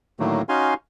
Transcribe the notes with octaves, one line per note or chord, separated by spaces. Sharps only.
A2 D3 D#3 F#3 A3 A#3
C#4 D#4 F#4 F5 G#5 C6